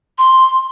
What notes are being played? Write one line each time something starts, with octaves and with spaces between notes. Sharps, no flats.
C6